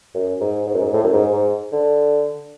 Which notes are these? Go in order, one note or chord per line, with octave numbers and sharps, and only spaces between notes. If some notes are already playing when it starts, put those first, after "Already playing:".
F#2
G#2
G#2
F#2
G#2
A2
F#2
G#2
G#2
D3